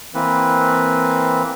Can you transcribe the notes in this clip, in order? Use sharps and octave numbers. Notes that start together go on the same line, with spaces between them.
E3 A#3 C4 B4